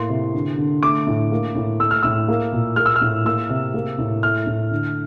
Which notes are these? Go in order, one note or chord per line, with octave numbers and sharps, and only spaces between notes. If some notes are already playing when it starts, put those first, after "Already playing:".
Already playing: A2 A#3 C6
C3
D3
D3
A3 D6
A2
A#3
A2
A3 E6
F6
A2 E6
A#3
A#2
A#3 F6
E6
F6
A2
A#3 E6
C3
A#3
A2
A3 F6
A2
D3